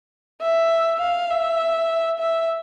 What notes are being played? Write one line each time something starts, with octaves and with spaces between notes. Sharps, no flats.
E5
F5
E5
E5